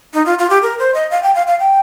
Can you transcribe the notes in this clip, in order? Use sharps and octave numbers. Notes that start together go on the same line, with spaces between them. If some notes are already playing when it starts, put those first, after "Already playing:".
D#4
F4
F4
G4
A#4
C5
D#5
F5
G5
F5
F5
G5